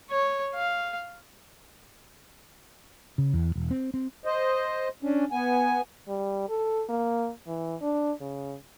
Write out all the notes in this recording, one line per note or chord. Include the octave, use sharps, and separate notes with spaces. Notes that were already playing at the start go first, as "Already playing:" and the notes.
C#5
F5
C#3
E2
E1
C4
C4
C5 D#5
C#4 D4
B3 G#5
G3
A4
A#3
E3
D4
C#3